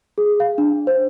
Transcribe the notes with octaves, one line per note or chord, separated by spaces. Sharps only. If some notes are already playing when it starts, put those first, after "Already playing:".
G#4
F5
D4
C5